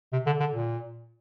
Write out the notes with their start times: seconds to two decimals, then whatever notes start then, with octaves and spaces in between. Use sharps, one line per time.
0.13 C3
0.26 D3
0.40 D3
0.54 A#2